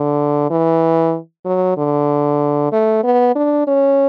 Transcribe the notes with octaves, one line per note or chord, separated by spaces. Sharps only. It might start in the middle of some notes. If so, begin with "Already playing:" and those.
Already playing: D3
E3
F#3
D3
A3
B3
D4
C#4